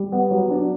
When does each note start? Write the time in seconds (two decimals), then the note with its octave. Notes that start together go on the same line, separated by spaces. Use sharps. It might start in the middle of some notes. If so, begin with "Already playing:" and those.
Already playing: G3
0.12 B3
0.31 F#3
0.50 D4